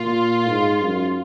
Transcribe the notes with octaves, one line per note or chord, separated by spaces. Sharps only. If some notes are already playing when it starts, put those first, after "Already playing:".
Already playing: A#2 F4
G#2
F#2